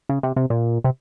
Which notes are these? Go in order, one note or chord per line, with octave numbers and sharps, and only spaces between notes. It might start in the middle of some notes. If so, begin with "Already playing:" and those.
C#3
C3
C3
A#2
C3